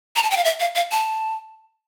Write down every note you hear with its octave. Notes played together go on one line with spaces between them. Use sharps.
A#5
A5
G5
F5
E5
F5
F5
A5